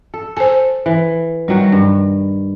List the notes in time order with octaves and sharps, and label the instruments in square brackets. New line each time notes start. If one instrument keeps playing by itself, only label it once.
[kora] A4
[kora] A4 [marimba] C5 G#5
[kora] E3
[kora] D#3 F#3 F#4 [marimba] G3
[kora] G2